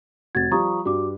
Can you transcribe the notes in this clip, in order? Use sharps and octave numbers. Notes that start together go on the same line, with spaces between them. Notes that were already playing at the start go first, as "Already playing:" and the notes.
F1 F#4 G#6 A6
F3 G3 A#5 C#6 D#6
G2 F#4 D6